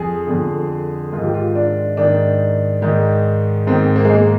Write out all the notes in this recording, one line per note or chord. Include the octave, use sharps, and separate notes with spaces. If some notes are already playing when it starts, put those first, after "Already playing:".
Already playing: F2 G#4
F2 D3
G#2 D#3 F4
G4
F4
D4
G#2 D#3 D4
G#2 D#3
G#2 D#3 C4
A#3
G#3
A#3